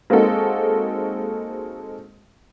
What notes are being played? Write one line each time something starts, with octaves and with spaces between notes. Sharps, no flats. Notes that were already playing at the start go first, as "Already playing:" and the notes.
G#3 A#3 C4 D#4 F#4 A4